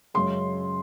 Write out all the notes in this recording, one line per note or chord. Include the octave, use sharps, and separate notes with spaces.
F#2 C#3 G#3 C6